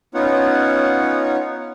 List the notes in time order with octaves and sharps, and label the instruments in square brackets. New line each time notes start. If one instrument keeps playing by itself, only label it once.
[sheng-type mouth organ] B3 C#4 D#4 F4 C#5 F#5